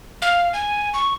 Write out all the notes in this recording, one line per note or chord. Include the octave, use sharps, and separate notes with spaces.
F5
G#5
C#6